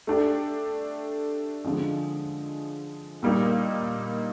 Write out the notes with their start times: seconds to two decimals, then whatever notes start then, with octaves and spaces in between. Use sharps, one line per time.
0.07 A3 D4 G4
1.64 D3 F3 G#3
3.23 A#2 G3 A#3 D#4